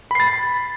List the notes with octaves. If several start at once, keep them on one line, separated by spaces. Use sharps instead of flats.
B5 A6 C7